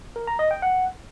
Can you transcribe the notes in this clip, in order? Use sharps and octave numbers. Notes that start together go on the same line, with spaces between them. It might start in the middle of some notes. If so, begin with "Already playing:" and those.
A#4
A#5
D#5
G5
F#5